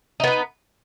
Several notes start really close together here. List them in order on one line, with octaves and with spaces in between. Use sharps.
D#4 B3 B4